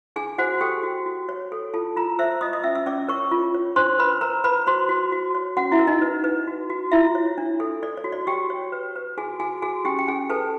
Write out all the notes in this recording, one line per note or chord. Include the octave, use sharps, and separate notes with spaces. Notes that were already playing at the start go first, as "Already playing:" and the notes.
D4 G#4 G#5
F#4 C5 F#5
G4 A4 G5
F#4
F#4
C#5
A4
F4 A4 A5
F4 A#4 A#5
C5 E5 E6
F4 D#5 D#6
D#5 D#6
C#4 E5 E6
E5 E6
C#4 D5 D6
A#4 C#5 C#6
F4
C#5
D4 C5 C6
A#4 B4 B5
A#4 B4 A#5
B4 B5
F#4 C5 C6
F#4
F#4
C#5
C#4 F#4 F#5
E4 E5
A#4
D#4 D#5
B4
B4
F#4
F#4
E4 F4 E5
C#5
D4
A4
A4 D5
C#5
F#4
D5
F#4 G4 G5
C#5
B4
B4
F#4 G#4 G#5
F#4 G#4 G#5
F#4 G#4 G#5
C#4 G4 G5
G5
C#4 G#4 G#5
A4 B4 A5